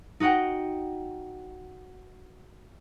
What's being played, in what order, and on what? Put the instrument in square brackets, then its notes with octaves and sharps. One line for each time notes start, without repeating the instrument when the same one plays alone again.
[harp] D#4 F#4 D#5 F#5 G5